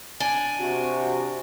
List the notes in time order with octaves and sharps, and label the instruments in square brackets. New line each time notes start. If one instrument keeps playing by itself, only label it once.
[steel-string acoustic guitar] D4 G#5
[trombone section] C3 F#4